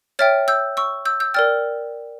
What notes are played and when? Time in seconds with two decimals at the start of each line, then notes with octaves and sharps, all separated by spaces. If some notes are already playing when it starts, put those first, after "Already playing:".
0.19 C#5 E5 G5 F6 A6
0.48 E6 G6
0.77 C#6 E6
1.05 E6 G6
1.20 E6 G6
1.34 A#4 D5 G5 F6 A6